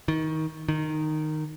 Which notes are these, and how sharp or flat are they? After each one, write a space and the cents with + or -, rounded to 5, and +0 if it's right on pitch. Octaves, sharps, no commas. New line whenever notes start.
D#3 +20
D#3 -10